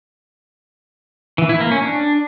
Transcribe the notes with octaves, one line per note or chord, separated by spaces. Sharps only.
E3
E4
A#3
C#4
D4